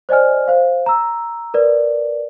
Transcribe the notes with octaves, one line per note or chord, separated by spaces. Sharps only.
C5 D5 D#5 G#5 F6
C5 F5
A#5 E6
A#4 B4 D5